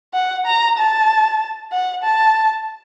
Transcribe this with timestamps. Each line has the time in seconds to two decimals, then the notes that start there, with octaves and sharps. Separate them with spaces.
0.14 F#5
0.46 A#5
0.78 A5
1.72 F#5
2.03 A5